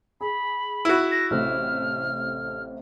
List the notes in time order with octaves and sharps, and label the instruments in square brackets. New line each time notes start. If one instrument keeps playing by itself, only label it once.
[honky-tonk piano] G#4 [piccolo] B5
[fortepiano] E4 F#4
[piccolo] A#6
[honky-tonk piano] A1 C3 A3 [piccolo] F6